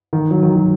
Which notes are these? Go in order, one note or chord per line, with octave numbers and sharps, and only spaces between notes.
D#3
F#3
D#3
F#3